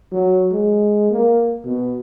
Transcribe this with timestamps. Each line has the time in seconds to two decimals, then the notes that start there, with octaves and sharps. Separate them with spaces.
0.12 F#3
0.52 G#3
1.11 A#3
1.65 B2